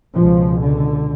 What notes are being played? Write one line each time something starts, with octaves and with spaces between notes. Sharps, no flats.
C#2 B2 F3
D3